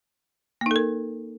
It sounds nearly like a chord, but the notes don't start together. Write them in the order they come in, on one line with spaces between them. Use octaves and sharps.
A#3 D#4 A4 A#4